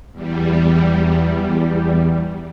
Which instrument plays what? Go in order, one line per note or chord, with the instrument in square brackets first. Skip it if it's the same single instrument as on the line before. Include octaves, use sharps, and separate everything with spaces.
[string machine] E2 G3